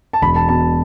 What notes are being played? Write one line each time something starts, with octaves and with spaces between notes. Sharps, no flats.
A5
E1 B5
A5
B2 A5